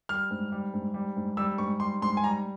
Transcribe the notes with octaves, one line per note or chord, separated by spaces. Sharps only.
G3 F6
G#2
G3
G#2
G3
G#2
G3 E6
G#2 C#6
G3 C6
G#2 C6
G#5
G3 A#5